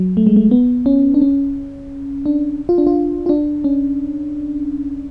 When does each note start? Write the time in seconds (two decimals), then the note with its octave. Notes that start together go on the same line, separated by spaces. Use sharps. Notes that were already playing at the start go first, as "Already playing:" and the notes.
Already playing: F#3
0.17 A3
0.27 G#3
0.36 A3
0.51 B3
0.86 C#4
1.14 D4
1.21 C#4
2.26 D4
2.69 F4
2.78 D4
2.87 F4
3.26 F4
3.29 D4
3.64 C#4